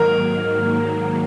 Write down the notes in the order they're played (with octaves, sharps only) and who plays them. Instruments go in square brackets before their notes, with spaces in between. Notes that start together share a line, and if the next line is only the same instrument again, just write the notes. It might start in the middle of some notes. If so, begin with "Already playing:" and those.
Already playing: [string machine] G#2 D#3 F#3 A#3 [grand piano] A#4